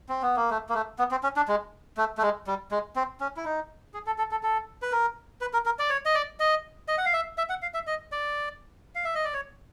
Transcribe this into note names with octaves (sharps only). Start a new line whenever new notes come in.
C4
B3
A#3
A3
A#3
A3
B3
C4
C#4
D4
G#3
A3
A3
G#3
G3
G#3
C4
C#4
E4
D#4
G#4
A4
A4
A4
A4
B4
A#4
B4
A#4
A#4
D5
C#5
D#5
D5
D#5
D#5
F#5
F5
E5
E5
F#5
F5
E5
D#5
D5
F5
E5
D#5
D5
C#5